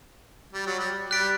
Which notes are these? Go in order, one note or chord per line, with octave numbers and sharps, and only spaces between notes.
G3
F#3
G3
G3 F#6 B6 D7